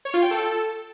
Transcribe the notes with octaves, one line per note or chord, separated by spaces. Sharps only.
C#5
F4
G5
A4